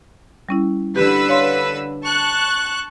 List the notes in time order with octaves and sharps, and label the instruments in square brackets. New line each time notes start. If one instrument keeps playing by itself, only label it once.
[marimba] G3 C#4 E4
[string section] D3 B4 E6 [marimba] G4
[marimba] C#5 F5 C6
[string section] A5 C#6 F#6